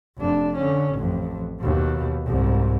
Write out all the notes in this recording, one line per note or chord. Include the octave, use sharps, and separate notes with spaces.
F1 D4
D3 C#4
A1 F2
D#2 B2
C2 G#2